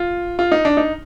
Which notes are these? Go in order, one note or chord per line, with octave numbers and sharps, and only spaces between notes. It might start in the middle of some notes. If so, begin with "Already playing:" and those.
Already playing: F4
F4
D#4
D4
D#4